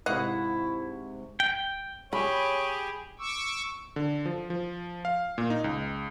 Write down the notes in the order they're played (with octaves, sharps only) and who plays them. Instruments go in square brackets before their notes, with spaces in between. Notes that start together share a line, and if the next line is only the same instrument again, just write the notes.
[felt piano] G#2 C3 C#6 [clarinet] E4 [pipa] D#5 F5 F#5
[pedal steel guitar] G5
[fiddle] G4 G#4 [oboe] C#5 [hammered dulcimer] B5
[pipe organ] C#6 D6 E6
[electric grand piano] D3
F3
F3
F5
A#2
D#4
C#2